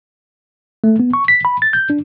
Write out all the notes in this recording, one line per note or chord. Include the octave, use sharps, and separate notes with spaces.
A3
B3
C#6
B6
B5
A6
G6
D4